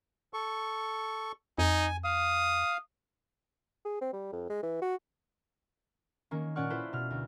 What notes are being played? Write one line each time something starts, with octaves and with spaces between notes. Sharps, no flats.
A4 C#6
F2 D#4 G#5
F5 D#6
G#4
C4
G3
F2
G#3
E3
F#4
D#3 A#3 C#4
A#2 C#4 D5 F#5 C#6 F6
E4 F4 A4 B4 C5
B2 F6
D2